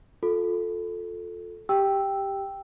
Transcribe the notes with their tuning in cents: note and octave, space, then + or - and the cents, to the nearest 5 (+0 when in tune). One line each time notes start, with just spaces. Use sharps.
F4 +25 A4 +0
G4 +0 G5 +0 E6 +0